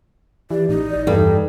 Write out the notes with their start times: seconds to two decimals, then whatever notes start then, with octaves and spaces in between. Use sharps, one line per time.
0.51 E3 G4 D5
0.69 A1 D#4
0.90 D5
1.07 E2 G2 G3 A4